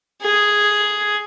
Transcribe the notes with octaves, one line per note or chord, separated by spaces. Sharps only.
G#4